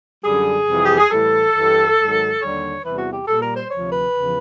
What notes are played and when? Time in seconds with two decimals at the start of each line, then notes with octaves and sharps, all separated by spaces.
0.25 F#2 D3 G3 G#4
0.68 F2 C3 E3 G3
0.84 G4
0.98 G#4
1.11 A2 E3 G3 A4
1.54 G2 E3 G3
1.97 G#2 D#3 F#3
2.41 D#2 D3 G3 C#5
2.84 E2 C3 E3 G3 B4
2.98 F#4
3.13 G4
3.27 A#2 G3 A4
3.42 A#4
3.56 C5
3.70 D2 C3 F3 C#5
3.92 B4
4.14 E2 C#3 F3